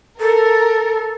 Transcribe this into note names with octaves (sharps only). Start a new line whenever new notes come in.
A4 A#4